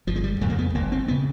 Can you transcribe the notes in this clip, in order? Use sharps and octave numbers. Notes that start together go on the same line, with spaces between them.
G1 F3
G#3
G3
F2 C#3 A3
A#3
B3
G1 A#3
C4
B3
C#3